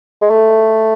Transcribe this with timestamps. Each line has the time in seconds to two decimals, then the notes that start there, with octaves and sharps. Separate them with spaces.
0.22 G#3
0.30 A3